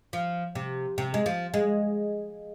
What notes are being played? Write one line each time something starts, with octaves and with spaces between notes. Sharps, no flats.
F3
C3
C3
G#3
F3
G#3